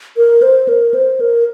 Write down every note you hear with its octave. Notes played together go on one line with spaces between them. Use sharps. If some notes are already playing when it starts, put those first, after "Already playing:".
A#4
C5
A#4
C5
A#4